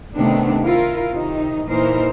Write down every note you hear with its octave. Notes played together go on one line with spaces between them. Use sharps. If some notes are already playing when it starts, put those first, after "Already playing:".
C3 D#3 A3 B3 D4
E4 F4 A#4
C3 D#3 D#4
A#2 E3 D#4 A#4 C5